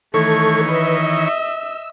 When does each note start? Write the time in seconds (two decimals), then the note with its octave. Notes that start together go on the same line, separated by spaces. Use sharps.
0.14 D#3 E3 A3 A4 C#5 C#6 G#6
0.69 B4 D#5 E5
1.14 E6